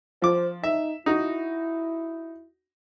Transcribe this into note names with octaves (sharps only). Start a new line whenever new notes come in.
F3 C5 D6
D#4 E5
D#4 E4 F#4